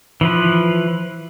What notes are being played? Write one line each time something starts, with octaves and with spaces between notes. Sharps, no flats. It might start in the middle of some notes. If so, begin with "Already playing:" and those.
E3 F3 B4